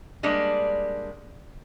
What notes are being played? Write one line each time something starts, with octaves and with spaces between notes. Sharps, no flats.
G3 G#3 A#3 D4